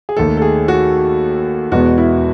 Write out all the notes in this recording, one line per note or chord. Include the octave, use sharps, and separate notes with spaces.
G#4
D#2 D#3 A3 A4
A4
G#4
F#4
E2 B2 G#3 B3 F#4
E4